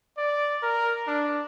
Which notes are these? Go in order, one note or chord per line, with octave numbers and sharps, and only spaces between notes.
D5
A#4
D4